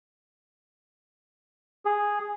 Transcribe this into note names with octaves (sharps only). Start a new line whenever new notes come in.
G#4